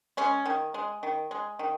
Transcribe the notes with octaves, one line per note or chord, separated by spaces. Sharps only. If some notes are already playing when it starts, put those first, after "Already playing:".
G#3 C#4
D#3
G#3
D#3
G#3
D#3